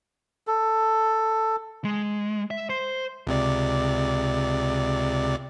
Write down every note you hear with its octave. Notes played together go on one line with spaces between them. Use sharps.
A4
G#3
E5
C5
C#2 C3 D5